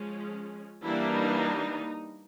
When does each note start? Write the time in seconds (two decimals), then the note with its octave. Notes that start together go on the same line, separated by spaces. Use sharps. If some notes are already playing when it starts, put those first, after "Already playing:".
Already playing: F3 G#3 C#4
0.84 E3 G3 A#3 D4 E4
1.14 D#4